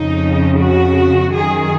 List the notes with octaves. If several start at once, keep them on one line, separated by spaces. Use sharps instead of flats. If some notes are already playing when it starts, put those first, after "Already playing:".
Already playing: F2 C#3 D#4
F#4
F#2 D#3 G#4